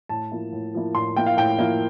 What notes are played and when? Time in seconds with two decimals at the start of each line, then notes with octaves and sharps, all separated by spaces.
0.09 A2 A5
0.32 F3 A#3 E4
0.53 A2
0.74 F3 A#3 E4
0.94 A2 C6
1.16 F3 A#3 E4 G5
1.26 F5
1.37 A2 G5
1.59 F3 A#3 E4